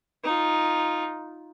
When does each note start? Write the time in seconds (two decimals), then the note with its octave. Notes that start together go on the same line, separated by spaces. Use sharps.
0.24 D#4 F4